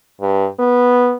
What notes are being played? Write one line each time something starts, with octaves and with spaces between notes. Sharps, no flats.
G2
B3